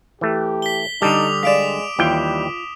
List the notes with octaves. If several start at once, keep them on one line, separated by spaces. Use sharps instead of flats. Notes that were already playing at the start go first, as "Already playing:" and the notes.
E3 A3 G4
B6 G7
D3 G3 D#4 A4 D6 D#6 F7
G#3 D5 F5 B6 D7 E7
D#2 E3 G3 F4 G5